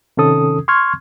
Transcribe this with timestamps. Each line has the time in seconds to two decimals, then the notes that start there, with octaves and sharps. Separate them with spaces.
0.17 C3 D#3 C#4 A4 D#6
0.68 C6 C#6 F6 G#6